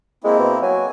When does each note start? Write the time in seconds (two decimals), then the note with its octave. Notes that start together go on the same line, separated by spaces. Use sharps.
0.24 G#3 A#3 C4 E4
0.39 B2
0.62 F#3 G#5